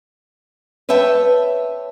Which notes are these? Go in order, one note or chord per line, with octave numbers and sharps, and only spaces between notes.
B4 C#5 E5 G5 A5